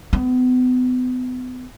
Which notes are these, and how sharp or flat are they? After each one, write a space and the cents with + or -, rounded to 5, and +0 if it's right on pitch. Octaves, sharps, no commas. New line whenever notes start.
B3 +35